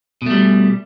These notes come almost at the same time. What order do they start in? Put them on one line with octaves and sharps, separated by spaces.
B2 A3 G3